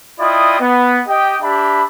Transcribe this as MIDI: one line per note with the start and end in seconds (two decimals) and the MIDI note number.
0.20 0.55 64
0.20 0.55 65
0.20 0.55 74
0.20 0.55 75
0.20 0.55 79
0.20 0.55 87
0.60 1.00 59
1.08 1.37 67
1.08 1.37 75
1.08 1.37 79
1.42 1.85 62
1.42 1.85 67
1.42 1.85 76
1.42 1.85 83